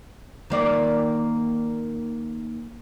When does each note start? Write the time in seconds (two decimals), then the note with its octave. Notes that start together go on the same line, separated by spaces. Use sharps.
0.50 D#3 A#3 D5